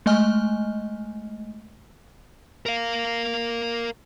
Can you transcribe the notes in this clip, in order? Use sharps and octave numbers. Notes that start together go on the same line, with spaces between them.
G#3 A3 D#5 G#5 F6
A#4 F5